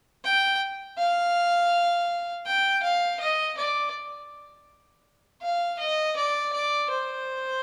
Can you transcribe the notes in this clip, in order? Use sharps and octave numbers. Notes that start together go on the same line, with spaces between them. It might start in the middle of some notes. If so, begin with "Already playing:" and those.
G5
F5
G5
F5
D#5
D5
F5
D#5
D5
D5
C5